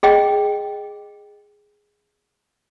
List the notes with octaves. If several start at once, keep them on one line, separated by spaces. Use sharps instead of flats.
G#4 D#5 G5